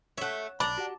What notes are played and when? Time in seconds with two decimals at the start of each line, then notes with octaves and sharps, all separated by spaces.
0.17 A3 C#5 E5 F#5
0.60 B1 D4 D5 A#5 B5
0.78 F#4 G4 F#5